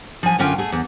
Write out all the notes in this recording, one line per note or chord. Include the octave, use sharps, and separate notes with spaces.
F3 G#5
F#2 D3 C#4 F4 G5
A3 G#4
E2